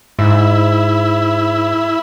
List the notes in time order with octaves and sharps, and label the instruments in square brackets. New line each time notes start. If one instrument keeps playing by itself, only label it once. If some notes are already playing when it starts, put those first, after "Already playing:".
[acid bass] G#2 [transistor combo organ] E4